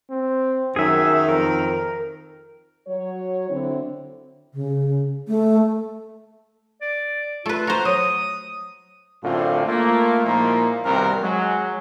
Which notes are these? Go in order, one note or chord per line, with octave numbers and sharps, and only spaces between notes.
C4
F#2 D#3 G#4 E5
F2 A#4
F#3 C#5
D3 C4 E4
C#3
A3
D5
A3 F4 B4
F#4 C5 A#5
F#3 D#6
F#2 A2 D3 C4 F4
A3 A#3 F4
A#2 F3 G#3 A#3 D#4 E4
C2 G2 B2 D#3 C4 A#4
F#3 G#3